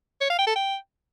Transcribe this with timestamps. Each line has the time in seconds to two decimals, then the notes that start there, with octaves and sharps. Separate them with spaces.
0.21 C#5
0.30 F5
0.38 G5
0.47 A4
0.56 G5